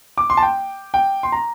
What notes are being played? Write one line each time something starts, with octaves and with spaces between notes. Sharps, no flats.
D6
C6
A5
G5
G5
C6
A#5